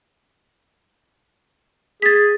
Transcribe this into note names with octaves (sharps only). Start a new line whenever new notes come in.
G#4 A6 B6